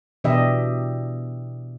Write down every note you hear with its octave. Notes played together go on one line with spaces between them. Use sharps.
B2 E3 D4 G4 D#5 E5